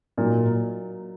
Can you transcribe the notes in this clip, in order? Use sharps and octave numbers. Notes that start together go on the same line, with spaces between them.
A#2 F#3 A#3 D#4 A#4